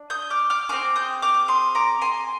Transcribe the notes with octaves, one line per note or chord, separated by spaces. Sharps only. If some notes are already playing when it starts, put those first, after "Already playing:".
Already playing: D4
D#6 G6
D6 F6
D6 F6
C4 D#4 G#4 D6 F6
D#6 G6
D6 F6
C6 D#6
A#5 D6
G#5 C6